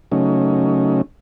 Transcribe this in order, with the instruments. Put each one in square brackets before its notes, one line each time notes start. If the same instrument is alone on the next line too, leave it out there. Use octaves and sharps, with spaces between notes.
[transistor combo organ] C#3 F#3 A3 C#4 D#4